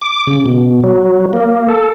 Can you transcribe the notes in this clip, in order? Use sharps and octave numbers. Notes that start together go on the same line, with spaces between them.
D6
C#3
B2
F#3
A#3
A4